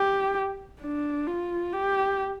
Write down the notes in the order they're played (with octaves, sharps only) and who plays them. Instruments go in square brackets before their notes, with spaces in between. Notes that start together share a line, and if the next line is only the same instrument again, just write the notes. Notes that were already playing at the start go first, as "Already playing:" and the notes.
Already playing: [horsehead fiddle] G4
D4
F4
G4